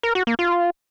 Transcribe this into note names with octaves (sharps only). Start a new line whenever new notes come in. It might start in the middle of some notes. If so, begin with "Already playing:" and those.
A#4
F#4
A#3
F4